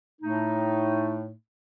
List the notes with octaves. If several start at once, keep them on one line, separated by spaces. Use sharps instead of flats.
A2 A3 D#4